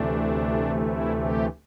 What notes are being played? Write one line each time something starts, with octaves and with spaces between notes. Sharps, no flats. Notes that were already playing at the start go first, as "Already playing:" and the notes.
Already playing: D2 C3 E3 A3 D4
E4
G4